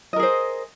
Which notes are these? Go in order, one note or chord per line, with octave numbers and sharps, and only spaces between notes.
G#4 A#4 C5 D#5